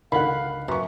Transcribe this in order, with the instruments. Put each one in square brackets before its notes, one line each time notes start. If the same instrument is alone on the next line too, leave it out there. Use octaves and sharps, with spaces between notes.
[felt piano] C#2 [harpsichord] D3 D#3 [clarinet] F5 [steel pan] F#5 B5
[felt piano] F#2 C#6 [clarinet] B4 [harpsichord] C5